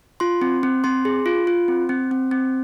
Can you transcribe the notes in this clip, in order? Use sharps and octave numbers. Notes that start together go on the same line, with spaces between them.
F4 C6
C4
C4
C4 C6
G#4
F4
F4
C4
C4
C4
C4